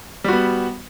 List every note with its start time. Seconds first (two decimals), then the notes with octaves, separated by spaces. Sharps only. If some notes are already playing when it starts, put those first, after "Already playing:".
0.24 G3
0.28 F#4
0.33 B3